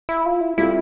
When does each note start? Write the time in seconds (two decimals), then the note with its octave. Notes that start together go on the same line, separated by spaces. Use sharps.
0.09 E4
0.26 F4
0.41 E4
0.58 G3 C4 E4 F4 A4